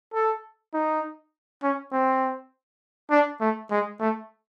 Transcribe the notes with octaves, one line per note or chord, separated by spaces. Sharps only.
A4
D#4
C#4
C4
D4
A3
G#3
A3